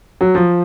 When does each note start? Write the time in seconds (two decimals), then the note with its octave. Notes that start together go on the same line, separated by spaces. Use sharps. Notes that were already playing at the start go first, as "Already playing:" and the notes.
0.21 F#3
0.35 F3